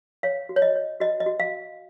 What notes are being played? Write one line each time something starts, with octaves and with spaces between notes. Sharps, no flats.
C#5 F5
F#4
C#5
D#5
C#5
F#4 D#5
D#5
F#4
F5